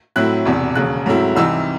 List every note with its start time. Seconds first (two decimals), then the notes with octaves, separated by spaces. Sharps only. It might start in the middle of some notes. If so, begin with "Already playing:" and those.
0.16 A2 F#3 C4 E4 F#6
0.46 E1 E2 C3
0.75 E1 D#2 C#3 F#6
1.06 G#2 F#3 A3 C4 E4
1.35 C2 C3 E3 C4 D#4 E6